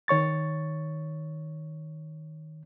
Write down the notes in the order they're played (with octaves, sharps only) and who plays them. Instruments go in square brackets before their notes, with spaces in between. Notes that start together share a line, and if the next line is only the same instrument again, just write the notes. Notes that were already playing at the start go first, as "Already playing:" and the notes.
[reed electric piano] D#3 C#5 C#6 A6